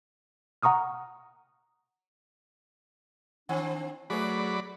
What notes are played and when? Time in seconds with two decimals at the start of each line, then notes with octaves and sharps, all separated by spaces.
0.63 F#5 A#5 C#6 D#6 F6
3.49 D#3 C4 D4
4.10 F#3 A3 G#4 B4 D5 B5